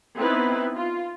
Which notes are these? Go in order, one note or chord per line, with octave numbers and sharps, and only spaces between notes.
B3 C4 D#4 E4 B4
F4